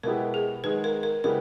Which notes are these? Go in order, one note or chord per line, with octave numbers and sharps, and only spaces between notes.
B2 G#3 B3 E4 G4 A#4
G#4
D#3 G#3 B3 B4
A#4
A#4
C#3 G#3 B3 E4 G4 A#4